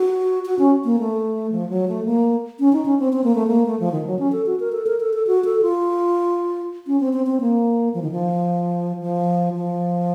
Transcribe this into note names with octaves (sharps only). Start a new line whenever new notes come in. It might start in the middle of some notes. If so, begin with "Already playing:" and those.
Already playing: F#4
F#4
C#4
A#3
A3
F3
F#3
A3
A#3
C#4
D#4
C#4
C4
C4
A#3
A3
A#3
A3
F3
D#3
F#3
C#4
A4
F#4
A#4
A4
A#4
A4
A4
F#4
A4
F4
C#4
C4
C4
C4
A#3
F3
D#3
F3
F3
F3